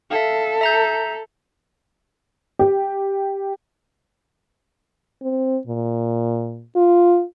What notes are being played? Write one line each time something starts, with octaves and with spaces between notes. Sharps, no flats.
A4 E5 F5
E5 A#5 G6
G4
C4
A#2
F4